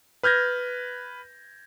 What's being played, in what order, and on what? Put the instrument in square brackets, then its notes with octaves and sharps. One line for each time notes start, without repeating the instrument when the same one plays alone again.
[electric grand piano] B4 F6 G6 G#6 A#6